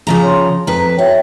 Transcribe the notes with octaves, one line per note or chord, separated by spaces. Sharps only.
C#3 F3 A#5
C#5 C6
F2 B4 A#5
F#4 C#5 E5 G5